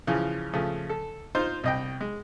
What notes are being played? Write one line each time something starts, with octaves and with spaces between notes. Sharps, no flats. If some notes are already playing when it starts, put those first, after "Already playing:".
C#3 E3 F3
C#3 F3 A3
A4
D#4 F4 C5
C2 D#5 G5
G#3